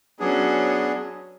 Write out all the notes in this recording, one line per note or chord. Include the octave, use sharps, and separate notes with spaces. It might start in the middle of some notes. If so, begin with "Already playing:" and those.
F#3 B3 C#4 D4 G#4